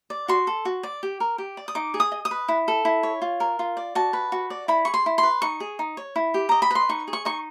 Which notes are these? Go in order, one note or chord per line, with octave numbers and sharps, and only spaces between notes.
D5
F#4 C6
A4
F#4
D5
G4
A#4
G4
D5
D#6
D#4 D6
G#4
D#6
D#5
D#6
B4
E4
A4
E4
C#5
F4
A#4
F4
D5
F#4 A5
B4
F#4
D5
E4 B5
G#4 C#6
C6
E4
C6
B4
D#4 C#6
G#4
D#4
C#5
E4
G4
D#5 A#5
B5
B4 C6
D#4 C#6
G#4
C#6
D#4 C#6